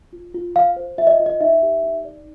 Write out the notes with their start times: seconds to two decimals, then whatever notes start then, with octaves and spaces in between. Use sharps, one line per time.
0.13 F4
0.34 F4
0.56 F4 F5
0.76 C5
0.98 F4 E5
1.07 D#5
1.20 F4
1.26 D#5
1.41 D#4 E5
1.62 G4
1.84 D#4
2.05 D5